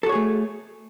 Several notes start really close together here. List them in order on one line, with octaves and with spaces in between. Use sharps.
A4 F#4 C#5 G#4 A3